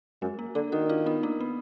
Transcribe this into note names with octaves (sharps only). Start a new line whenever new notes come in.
F#2 G#3
A#3
D3 A#3 D4
D#3 D#4 F#4
D4 F4
B3 D#4
A#3 D4
B3